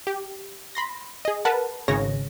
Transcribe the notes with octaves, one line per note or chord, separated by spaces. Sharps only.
G4
B5 C6 A#6
G#4 D#5
A#4 B4 F#5 A5
G#1 C#3 G#4 C#5 A#6